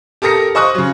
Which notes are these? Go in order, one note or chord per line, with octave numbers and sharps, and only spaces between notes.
G4 A4 A#4 D#6 A#6 C#7
C5 D#5 C#6 D#6 F#6
C#3 F#3